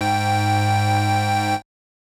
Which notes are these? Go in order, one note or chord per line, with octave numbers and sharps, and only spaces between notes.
G#2 G5